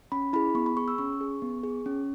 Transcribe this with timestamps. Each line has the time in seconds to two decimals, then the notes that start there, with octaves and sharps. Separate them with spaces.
0.12 C#4 B5
0.33 E4 G#4 B5
0.55 B3 C#6
0.66 B5
0.77 G#4 C#6
0.88 E6
0.98 C#4 C#6
1.21 G#4
1.42 B3
1.63 G#4
1.86 C#4